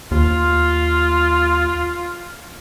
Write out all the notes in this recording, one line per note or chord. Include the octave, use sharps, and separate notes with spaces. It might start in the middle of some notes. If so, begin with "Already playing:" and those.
D#2 F4